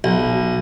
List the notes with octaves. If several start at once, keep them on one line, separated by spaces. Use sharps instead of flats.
B1